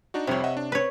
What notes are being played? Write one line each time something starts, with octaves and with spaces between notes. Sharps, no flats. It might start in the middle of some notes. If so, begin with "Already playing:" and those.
D4 D#4 F#4
C2 F2 C3 C#5
D#5 E5 F#5
D4
C4 B4 C#5